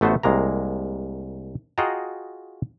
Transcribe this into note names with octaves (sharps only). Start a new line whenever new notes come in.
A1 A3 B3 F#4 C5
C2 G#3 A#3 A#5
F4 F#4 G#4 D#5 G5 A#5